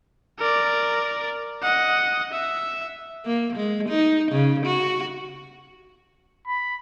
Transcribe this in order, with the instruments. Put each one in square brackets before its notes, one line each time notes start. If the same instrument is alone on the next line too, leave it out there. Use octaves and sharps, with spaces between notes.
[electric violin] A#4 D5
D#5 F#5
E5
[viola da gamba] A#3
G#3
D#4
C#3
F#4
[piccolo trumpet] B5